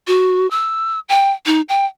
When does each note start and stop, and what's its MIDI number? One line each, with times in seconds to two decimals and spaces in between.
0.08 0.49 66
0.51 1.00 88
1.09 1.31 79
1.46 1.61 63
1.69 1.85 79